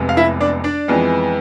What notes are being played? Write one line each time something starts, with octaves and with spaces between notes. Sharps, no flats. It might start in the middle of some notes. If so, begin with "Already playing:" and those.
Already playing: F1 E2 C3 G#3 B3
F5
E4 E5
D4 D5
D4 D5
F2 E3 G#3 B3